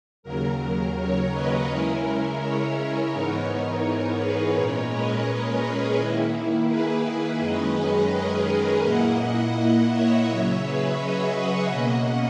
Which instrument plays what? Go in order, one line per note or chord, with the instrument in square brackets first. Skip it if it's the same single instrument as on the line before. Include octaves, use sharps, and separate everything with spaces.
[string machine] D#2 C#3 F#3 A#4
A#4 C#5
B4 D#5
C#3 G#3 C#4 E4 A#4
A#4 C#5
G#2 E3 B3 D#4
A#4 C#5
G#4 B4
A#2 G#3 C#4 A#4 C#5
B4 D#5
A#4 C#5
G#4 B4
D#3 A#3 E4
G#4 B4
F#2 D#3 G#3 C#4 B4 D#5
G#4 B4
A#4
A#2 A#3 E4 D#5 F#5
D#5 F#5
C#5 E5
C#3 F#3 C#4
G#4 B4
B4 D#5
D#5 F#5
B2 A#3 C#4